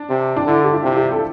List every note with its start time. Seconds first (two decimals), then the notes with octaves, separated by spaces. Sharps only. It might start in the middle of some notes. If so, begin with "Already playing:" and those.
Already playing: D4
0.10 C3
0.36 D4
0.46 D3 E4
0.64 G4
0.72 F4
0.84 C3
0.97 G4
1.11 A4